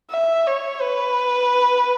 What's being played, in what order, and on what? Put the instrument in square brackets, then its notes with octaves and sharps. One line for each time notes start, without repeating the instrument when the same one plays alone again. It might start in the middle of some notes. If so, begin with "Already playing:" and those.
[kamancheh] E5
C#5
B4